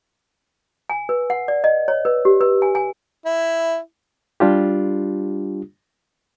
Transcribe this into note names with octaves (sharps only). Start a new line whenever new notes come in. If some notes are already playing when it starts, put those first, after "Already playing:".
G#5
B4
F#5
D5
D#5
C#5
B4
G4
B4
G#5
G#5
E4
G3 D4 F4 G4